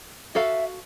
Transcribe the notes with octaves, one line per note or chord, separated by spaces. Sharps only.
F#4 A4 E5 F5